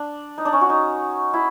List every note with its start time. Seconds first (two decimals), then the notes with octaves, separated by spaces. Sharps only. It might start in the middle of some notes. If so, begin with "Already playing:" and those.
Already playing: D4
0.38 D#4
0.45 D4
0.53 C#4
0.61 F#4
0.70 D#4
1.34 E4